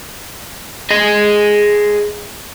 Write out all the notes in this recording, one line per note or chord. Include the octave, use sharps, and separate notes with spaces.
G#4 D#5